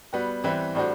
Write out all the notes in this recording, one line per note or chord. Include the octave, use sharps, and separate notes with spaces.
G3 B3 F#4
E3 G3 C4 E4 B4
A2 G3 D4 F#4 C5